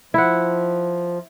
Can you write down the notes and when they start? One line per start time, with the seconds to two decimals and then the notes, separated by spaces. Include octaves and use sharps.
0.14 F3 E4 F#5